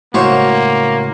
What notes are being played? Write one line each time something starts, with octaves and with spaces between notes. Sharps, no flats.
C#2 A2 A#3 F#4 C5 C#5